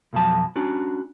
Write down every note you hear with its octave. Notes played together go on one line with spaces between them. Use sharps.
B1 F2 F3 F#3 A5
C#4 D4 F#4